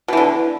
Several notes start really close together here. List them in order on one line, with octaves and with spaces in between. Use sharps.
B2 E3 D3